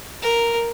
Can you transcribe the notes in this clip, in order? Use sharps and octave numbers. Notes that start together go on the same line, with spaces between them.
A#4